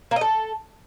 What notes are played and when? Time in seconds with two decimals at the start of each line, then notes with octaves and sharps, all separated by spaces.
0.11 A#3
0.16 D#5
0.21 A4